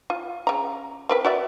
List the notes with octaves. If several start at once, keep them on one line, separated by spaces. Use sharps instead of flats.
F4
C#3 A#5
C4 A#4 B4
F#4 D5 E5